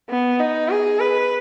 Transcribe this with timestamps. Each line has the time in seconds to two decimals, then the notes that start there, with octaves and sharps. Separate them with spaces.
0.10 B3
0.39 D#4
0.69 G#4
1.00 B4